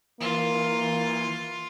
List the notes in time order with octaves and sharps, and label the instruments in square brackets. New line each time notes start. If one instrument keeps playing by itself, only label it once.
[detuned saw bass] E3 [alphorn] A#3 [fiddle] F4